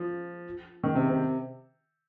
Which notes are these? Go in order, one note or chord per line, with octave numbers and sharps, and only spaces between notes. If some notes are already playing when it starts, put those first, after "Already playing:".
Already playing: F3
D#3
C3
C3